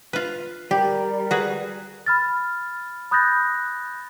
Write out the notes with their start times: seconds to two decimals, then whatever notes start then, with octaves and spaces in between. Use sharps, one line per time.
0.13 F4 B4
0.71 G3 G4 A#4
1.31 F#4 G#4 B4
2.06 B5 F6 A6
3.11 B5 D#6 F#6 G6 A6 A#6